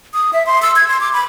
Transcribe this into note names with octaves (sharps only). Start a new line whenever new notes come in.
D#6
E5
C6
E6
G#6
C6
D6
B5